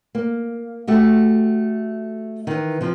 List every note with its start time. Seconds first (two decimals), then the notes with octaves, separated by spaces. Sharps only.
0.15 A#3
0.87 A3 F#4 G4
2.47 D#3 E3
2.81 C3 F3